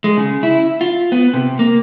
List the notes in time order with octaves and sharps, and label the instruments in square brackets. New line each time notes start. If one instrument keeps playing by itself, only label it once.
[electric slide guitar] G#3
C#3
E4
F4
B3
C3
A#3